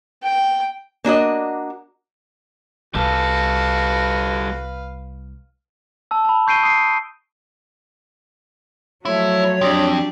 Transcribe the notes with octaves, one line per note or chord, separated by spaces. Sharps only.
G5
A#3 D4 F#4 D#5
C2 G3 F#4 A4 B4 F5
A5 E6
A5 B5
C#6 G6 C7 D7 D#7 G7
D#6 C7
F3 F#3 A3 E4 C#5
F2 D4 G4 D5